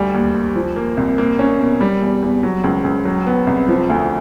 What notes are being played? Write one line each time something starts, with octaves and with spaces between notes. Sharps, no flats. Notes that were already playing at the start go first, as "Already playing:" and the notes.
Already playing: D2 G3
D#2
D#2
F3
A#3
C2
A#3
C#4
B2
G3
E2
E2
F#3
C#2
C#2
F#3
B3
C2
F3
D2